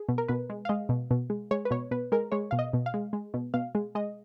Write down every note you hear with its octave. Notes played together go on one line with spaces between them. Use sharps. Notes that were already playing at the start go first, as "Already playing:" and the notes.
Already playing: G#4
B2
A#4
B2 B4
G#3
F5
G#3 D#5
B2
B2
G#3
G#3 C#5
B4
B2 C#5
B2 B4
G#3 A#4
G#3 C#5
B2 F5
D#5
B2
F5
G#3
G#3
B2
B2 F5
G#3
G#3 D#5